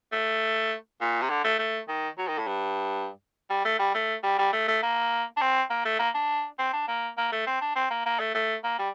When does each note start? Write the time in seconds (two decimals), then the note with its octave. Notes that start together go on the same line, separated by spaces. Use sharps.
0.12 A3
1.01 A#2
1.21 C3
1.30 D3
1.44 A3
1.59 A3
1.88 D#3
2.18 F#3
2.28 D#3
2.38 A2
2.47 G2
3.50 G3
3.65 A3
3.79 G3
3.94 A3
4.23 G3
4.39 G3
4.53 A3
4.68 A3
4.83 A#3
5.37 D4
5.41 C4
5.70 A#3
5.85 A3
5.99 A#3
6.14 D4
6.59 C4
6.73 D4
6.88 A#3
7.18 A#3
7.32 A3
7.47 C4
7.61 D4
7.76 C4
7.91 A#3
8.06 A#3
8.19 A3
8.34 A3
8.64 A#3
8.79 G3